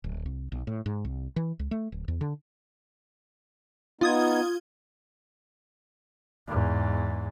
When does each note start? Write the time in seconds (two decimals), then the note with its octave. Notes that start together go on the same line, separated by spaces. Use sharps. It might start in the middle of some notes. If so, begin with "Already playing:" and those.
0.04 D1
0.26 C2
0.52 B1
0.67 A2
0.86 G#2
1.05 C2
1.36 E3
1.59 C#2
1.71 A3
1.92 D1
2.08 E2
2.21 D3
4.01 B3 D#4 F4 D#6 G#6
6.48 E2 G#2